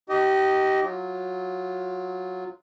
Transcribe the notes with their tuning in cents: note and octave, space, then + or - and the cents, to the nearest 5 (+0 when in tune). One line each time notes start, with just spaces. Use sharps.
D#4 +0 G4 -25 D#5 +0
F#3 -10 F4 +0